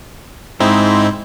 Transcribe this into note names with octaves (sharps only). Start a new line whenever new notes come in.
G#2 C4 D#4 E4